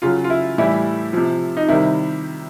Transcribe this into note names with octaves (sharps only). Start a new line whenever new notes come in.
C#3 F#3 F4
F4
E4
A2 E3 G3 E4
C3 F3
D#4
C3 D#3 G3 E4